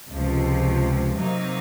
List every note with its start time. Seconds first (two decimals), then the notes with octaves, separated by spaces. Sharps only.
0.11 C#2 C3 F3
1.17 C3 F#3 A#3 D#4